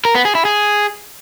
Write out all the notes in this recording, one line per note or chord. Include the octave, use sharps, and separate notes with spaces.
A#4
B3
G#4
E4
G#4